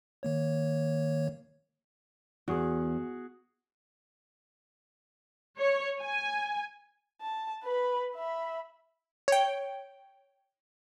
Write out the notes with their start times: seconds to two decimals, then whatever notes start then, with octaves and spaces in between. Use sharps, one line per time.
0.23 D#3 A#3 C#5
2.48 E2 F#4 G#4
5.58 C#5
6.01 G#5
7.21 A5
7.64 B4 B5
8.15 E5 B5
9.28 C#5 G5